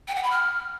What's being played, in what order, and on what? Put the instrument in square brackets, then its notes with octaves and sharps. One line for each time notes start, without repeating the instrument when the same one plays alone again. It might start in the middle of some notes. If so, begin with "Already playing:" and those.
[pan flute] G5
F#5
B5
F6